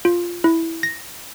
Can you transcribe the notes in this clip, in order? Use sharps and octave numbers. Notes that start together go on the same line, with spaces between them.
F4
E4
A#6